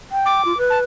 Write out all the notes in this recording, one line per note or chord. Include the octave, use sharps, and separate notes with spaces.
G5
D6
F4
B4
A5